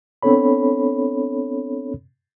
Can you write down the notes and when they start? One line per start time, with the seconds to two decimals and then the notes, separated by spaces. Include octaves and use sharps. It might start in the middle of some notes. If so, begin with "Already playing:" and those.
0.23 B3 C4 D4 A4 C#5 B5